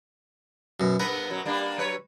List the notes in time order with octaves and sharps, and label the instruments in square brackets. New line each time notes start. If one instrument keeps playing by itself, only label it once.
[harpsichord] F#2 B2
[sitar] G2 B3 B4 [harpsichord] A#4
[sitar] F#2 B2 F#3
G3 A#3 D4
F#3 B4 C#5